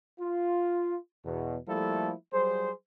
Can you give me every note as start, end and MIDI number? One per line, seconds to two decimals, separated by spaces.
0.19 0.97 65
1.25 1.56 40
1.25 1.56 47
1.67 2.12 53
1.67 2.12 55
1.67 2.12 57
1.67 2.12 58
1.67 2.12 64
1.67 2.12 69
2.33 2.71 54
2.33 2.71 55
2.33 2.71 68
2.33 2.71 72